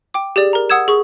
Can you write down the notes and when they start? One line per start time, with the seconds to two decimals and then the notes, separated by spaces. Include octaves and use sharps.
0.14 G5 D6
0.36 G4 G#4 D5
0.53 A#4 A#5
0.70 F#5 D#6 E6 G#6 E7
0.88 G#4 C#6